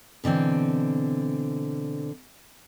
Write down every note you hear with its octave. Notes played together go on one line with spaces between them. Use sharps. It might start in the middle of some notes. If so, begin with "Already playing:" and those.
B2 D3 E3 C4